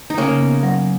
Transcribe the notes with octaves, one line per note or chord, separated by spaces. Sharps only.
D#4
C#3 A#3 C#4
B3
F#3